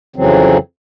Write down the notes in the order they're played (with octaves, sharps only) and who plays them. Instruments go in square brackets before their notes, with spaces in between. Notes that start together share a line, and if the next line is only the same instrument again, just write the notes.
[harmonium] F2 C#3 E3 F#3 C4